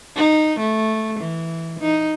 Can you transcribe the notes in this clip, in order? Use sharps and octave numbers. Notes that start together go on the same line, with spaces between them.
D#4
A3
E3
D#4